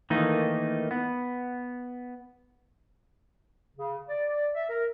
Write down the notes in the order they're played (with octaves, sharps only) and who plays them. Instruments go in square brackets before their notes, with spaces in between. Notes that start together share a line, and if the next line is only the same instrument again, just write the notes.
[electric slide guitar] D#3 E3 A3 A#3 D#4
B3
[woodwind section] C#3
D5
E5
A#4